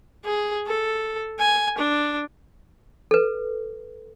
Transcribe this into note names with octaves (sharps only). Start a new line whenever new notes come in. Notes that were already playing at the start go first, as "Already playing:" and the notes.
G#4
A4
G#5
D4
A4 B4